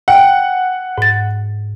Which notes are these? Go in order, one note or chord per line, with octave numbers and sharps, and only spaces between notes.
F#5 G5
G#2 A6